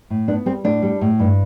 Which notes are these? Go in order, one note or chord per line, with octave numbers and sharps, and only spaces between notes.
A2
B3 D4
G3 C4
A2 D4
G3
A2
G2